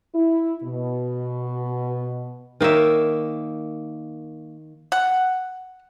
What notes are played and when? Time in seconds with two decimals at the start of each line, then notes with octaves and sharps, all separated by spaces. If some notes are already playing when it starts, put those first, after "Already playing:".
0.14 E4
0.64 B2
2.60 D#3 A#3 C#5 E5
4.92 F#5